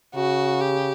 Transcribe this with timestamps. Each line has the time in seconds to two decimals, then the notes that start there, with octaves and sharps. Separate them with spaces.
0.15 C#3 F#4
0.60 G4